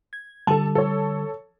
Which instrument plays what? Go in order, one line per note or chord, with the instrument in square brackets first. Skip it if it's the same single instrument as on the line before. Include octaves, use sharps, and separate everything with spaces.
[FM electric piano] G#6
[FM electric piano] D3 G3 [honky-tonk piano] A4 A5
[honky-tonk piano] A4 C#5